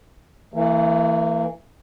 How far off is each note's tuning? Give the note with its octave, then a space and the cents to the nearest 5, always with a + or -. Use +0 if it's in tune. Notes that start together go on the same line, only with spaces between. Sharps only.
E3 +0 A#3 -45